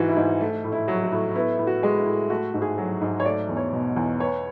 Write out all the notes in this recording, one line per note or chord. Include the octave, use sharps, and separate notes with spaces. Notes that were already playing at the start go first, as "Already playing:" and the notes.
Already playing: G#2 E3 F#4
E4
G#2
A3
A2
E4
F#3
F#4
A2
B3 E4
A2
F#4
G#3
E4
A2
A3 F#4
G#2
G#4
F#3
G#2
C#5
A3 D5
E2
C#5
B2
E2
B3 C#5